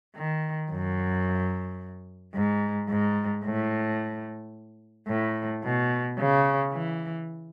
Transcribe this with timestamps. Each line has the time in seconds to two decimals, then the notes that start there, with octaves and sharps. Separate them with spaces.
0.16 D#3
0.71 F#2
2.34 G#2
2.89 G#2
3.45 A2
5.08 A2
5.64 B2
6.18 C#3
6.72 E3